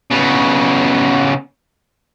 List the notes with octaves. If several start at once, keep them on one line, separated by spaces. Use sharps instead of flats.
C#3 B3